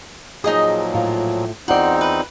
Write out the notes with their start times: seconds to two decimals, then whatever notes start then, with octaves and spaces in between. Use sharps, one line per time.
0.44 A#2 F3 F#3 D#4 G#4 D#5 D#6
0.94 A2 F4
1.68 E2 C4 D#4 F4 D5 F#5 C6
2.01 B4